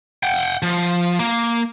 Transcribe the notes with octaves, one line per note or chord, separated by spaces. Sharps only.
F#5 G5
F3
A#3